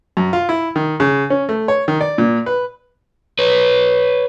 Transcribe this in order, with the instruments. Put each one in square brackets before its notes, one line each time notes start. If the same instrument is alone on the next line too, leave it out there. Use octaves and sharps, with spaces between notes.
[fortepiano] F#2
F4
E4
D#3
C#3
C#4
A3
C#5
D#3
D5
A#2
B4
[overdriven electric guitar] B4 C#5